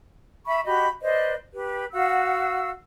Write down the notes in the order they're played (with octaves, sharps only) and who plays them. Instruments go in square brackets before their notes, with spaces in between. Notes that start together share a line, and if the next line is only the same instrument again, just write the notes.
[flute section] E5 B5 C#6
F#4 G4 D#5 B5
B4 C5 D5 D#5
G4 B4
F#4 F5 F#5 E6